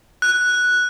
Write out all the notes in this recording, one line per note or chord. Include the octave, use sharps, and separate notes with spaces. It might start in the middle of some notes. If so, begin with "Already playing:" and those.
F#6